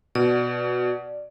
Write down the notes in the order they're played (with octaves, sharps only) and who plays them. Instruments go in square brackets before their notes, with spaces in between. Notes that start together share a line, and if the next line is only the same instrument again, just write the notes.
[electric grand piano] B2 [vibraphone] D5